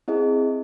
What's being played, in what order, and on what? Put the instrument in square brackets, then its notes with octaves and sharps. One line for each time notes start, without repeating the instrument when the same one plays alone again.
[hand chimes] C4 E4 G#4 D#5